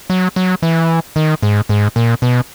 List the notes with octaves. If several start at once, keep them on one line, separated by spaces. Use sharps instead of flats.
F#3
F#3
E3
D#3
G#2
G#2
A#2
B2